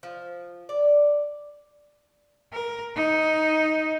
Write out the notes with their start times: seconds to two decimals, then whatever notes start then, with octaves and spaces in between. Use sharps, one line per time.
0.03 F3
0.69 D5
2.53 A#4
2.96 D#4